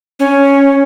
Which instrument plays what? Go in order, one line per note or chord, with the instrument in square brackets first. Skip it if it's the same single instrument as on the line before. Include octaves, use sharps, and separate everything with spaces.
[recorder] C#4